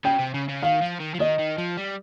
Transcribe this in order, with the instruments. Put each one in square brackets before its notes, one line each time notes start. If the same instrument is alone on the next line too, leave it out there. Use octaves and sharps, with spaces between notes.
[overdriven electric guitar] C#3 [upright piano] G5
[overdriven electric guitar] C3
C#3
C#3
[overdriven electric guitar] D#3 [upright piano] F5
[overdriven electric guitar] F3
D#3
F3
[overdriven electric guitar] D#3 [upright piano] D#5
[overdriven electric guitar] D#3
F3
G3